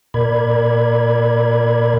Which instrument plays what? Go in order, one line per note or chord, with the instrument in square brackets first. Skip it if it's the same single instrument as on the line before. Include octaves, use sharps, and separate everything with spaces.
[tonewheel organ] A#2 A#4 D5 B5 G#6